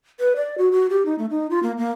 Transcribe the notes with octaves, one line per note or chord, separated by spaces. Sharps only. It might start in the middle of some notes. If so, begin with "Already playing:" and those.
B4
D5
F#4
F#4
G4
D#4
A3
D#4
F4
A#3
A#3